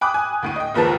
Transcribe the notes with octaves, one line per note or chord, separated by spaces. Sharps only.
G5 G#5 B5 D6 D#6 F#6
G#5
D2 A2 D#7
D#5 G5
F#1 D#2 G#2 F3 B4 A5